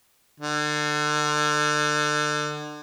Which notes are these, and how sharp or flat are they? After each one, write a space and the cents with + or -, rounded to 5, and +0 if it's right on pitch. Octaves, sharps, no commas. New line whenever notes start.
D3 +35